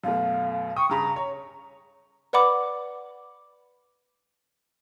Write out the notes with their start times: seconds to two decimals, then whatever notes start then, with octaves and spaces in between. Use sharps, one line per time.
0.04 F#2 B2 A3 F5
0.76 G5 C#6 D#6
0.90 G2 C#3 A#5 B5
1.16 C#5
2.33 B4 D5 F#5 B5 D6